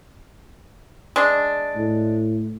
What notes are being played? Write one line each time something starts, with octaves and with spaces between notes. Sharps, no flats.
G#3 D4
A2